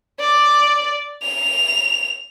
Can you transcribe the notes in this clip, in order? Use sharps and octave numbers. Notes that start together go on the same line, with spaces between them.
D5
F7